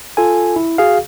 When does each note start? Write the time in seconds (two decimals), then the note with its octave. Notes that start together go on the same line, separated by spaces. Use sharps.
0.17 F4 A4 G#5
0.56 E4
0.78 F#4 G#4 F5